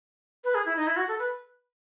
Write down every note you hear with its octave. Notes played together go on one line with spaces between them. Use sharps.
B4
G#4
E4
D#4
E4
F#4
A4
B4